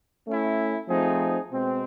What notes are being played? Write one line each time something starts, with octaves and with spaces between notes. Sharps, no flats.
A3 C#4 E4
F3 A3 C4 D#4 G#4
B2 G#3 C4